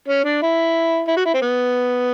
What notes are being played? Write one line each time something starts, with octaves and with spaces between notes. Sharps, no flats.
C#4
D4
E4
E4
F#4
E4
C4
B3